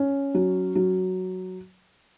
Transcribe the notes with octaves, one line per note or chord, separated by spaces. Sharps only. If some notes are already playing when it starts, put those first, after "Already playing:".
Already playing: C#4
F#3
F#3